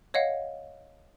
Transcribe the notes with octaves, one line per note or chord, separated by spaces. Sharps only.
C#5 D#5 F5 F#5